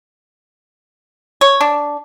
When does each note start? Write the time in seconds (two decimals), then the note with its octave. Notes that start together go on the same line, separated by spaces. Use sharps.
1.41 C#5
1.61 D4